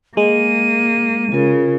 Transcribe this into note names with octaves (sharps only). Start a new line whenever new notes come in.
G#3 A#3 D#7
C#3 F4 A#4